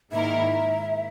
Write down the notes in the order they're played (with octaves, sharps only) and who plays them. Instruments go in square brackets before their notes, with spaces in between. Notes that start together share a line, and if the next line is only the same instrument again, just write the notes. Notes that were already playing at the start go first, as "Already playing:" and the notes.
[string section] G#2 D#3 A#3 E4 A#4 [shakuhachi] E5